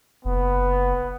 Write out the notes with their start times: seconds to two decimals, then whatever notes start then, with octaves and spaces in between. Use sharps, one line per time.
0.25 F#1 B3